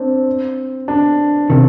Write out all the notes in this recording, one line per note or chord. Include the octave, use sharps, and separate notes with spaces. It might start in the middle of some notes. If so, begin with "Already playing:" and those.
Already playing: C4 D4
D4
C3 D#3